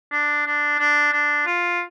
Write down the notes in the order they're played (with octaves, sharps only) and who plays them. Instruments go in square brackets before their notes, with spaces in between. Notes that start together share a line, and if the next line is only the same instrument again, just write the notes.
[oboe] D4
D4
D4
D4
F4